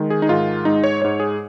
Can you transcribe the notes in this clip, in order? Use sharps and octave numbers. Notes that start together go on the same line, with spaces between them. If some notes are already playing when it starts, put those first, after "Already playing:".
Already playing: D#3 G#3
G#4
D#4
G#2 D#3 G#3 F4
G#2 G#3 D#4
C#5
G#2 G#3 C#5
G#4